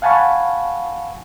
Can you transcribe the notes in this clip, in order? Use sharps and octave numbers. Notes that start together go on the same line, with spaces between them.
F5 F#5 G#5 A5 B5 C#6